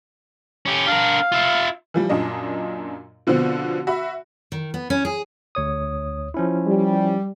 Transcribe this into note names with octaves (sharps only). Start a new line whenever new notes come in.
C#4 G4
D4 A#4 F5
F4 E5
E3 F3 G3
F#2 A#2 D4 D#5
B2 D3 F3 B3 C4
F#4 E5 B5
D#3
B3
C#4
G#4
D2 C#5 D#6
F3 C#4 E4
G3